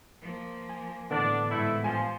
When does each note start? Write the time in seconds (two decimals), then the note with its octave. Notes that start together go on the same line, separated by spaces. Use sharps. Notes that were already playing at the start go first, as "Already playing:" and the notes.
0.21 F3 A#3
0.69 G#5
1.11 A2 D3 E3 B3 D4
1.50 G#2 G3 A3 E4
1.84 F3 G3 G#5